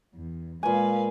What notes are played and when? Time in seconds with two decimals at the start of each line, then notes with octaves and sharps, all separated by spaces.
0.14 E2
0.63 A#2 G#3 B4 F5 G#5